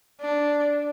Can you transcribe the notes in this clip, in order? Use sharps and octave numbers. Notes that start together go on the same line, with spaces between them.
D4